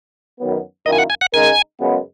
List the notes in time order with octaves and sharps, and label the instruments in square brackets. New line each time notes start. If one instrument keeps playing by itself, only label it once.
[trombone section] F#2 D#3 F#3 B3
[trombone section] F#2 D#3 A#3 E4 A#4 [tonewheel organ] D#5
[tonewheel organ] G#5
F#5
G#5
F#5
[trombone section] C#3 G#3 D#4 A#4 [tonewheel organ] G#5
[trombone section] F#2 C#3 G#3 B3